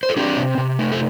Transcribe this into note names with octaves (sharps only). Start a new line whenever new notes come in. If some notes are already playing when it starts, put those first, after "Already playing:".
C5
A4
C4 D4 G4
C3
C3
A3
A4